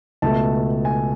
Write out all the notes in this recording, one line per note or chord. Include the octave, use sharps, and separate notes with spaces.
C#2 B2 A3 A5
G#5